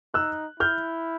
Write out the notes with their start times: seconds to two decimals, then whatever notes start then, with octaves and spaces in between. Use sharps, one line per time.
0.14 D#4 E6 F#6
0.60 E4 F6 G6